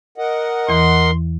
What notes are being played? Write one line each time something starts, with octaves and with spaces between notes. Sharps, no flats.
A#4 D#5 F#5
E2 E3 C6